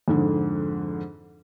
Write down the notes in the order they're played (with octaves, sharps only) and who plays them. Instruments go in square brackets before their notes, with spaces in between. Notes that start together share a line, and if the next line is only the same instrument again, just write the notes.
[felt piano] F2 G#2 D3